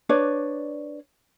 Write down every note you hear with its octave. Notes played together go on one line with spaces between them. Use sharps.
D4 B4 C#5 D5